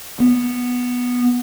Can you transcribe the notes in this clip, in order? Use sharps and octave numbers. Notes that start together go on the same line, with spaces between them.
B3